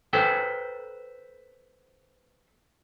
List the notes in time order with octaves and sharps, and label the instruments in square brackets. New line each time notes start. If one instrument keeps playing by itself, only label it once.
[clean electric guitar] A4 B4 C5 G5